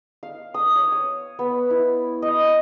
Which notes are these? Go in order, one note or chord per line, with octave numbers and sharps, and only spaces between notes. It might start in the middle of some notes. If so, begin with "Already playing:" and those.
F5
D#6
C#5
D#6
B3
E4
D#5